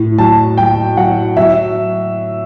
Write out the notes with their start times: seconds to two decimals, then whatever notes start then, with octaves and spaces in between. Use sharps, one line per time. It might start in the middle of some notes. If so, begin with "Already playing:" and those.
Already playing: A2
0.18 F#3 A5
0.57 F#3 G5
0.97 F#3 F#5
1.37 F#3 E5